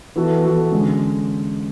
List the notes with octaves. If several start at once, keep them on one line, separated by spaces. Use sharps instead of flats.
E3 B3 F#4 A4
E3 B3 F#4 A4
D3 G#3 C#4